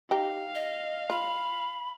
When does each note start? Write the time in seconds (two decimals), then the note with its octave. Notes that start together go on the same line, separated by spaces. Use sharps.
0.11 D#4 G4 F5
0.55 D#5
1.10 F4 B5